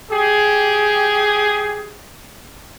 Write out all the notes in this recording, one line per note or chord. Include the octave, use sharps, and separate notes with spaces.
G4 G#4